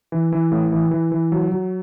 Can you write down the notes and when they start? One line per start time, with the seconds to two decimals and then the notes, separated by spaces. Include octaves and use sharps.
0.12 E3
0.32 E3
0.52 A2
0.72 E3
0.91 E3
1.12 E3
1.32 F#3
1.52 F#3